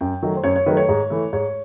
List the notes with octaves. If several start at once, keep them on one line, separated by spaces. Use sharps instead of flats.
F#2 G5
D#3 F#3 A3
C5
F#2 C#5
C#5
D#3 F#3 A3 B4
C#5
G#2
E3 A3
G#2 C#5